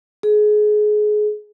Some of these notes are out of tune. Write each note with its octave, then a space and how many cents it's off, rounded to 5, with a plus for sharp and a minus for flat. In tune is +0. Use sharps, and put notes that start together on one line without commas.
G#4 +25